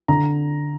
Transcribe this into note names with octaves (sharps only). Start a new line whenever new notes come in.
D3 A#5